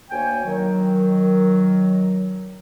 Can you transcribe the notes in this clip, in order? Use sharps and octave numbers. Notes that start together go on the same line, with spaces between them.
D2 A#3 C#5 G5 G#5
D#3 F#3